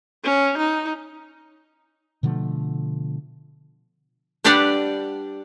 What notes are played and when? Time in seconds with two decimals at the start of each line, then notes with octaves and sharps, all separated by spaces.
0.24 C#4
0.58 D#4
2.23 B2 D3 F3 A3
4.44 G3 D4 G4 B4 D5 F#5